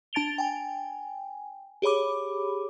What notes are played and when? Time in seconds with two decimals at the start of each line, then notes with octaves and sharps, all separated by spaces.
0.13 D4 A5 A6 D7 F7 G7
0.38 G5 G#5
1.82 G4 G#4 C#5 B5 D6